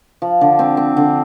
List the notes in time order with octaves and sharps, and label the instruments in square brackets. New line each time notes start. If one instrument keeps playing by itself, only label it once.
[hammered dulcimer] F3
D3
C4
C4
D3